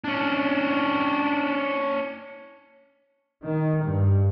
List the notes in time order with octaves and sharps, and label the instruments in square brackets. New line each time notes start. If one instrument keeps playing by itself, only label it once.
[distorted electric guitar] C#4 D4
[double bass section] D#3
G2